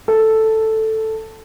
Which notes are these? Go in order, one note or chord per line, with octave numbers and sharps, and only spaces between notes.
A4